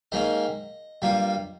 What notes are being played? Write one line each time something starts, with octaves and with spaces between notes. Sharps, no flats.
G#2 D#3 A#3 C#4 D#5
G2 G3 A#3 F4